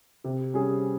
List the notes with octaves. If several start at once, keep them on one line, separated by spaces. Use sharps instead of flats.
C3
G3 C#4 G#4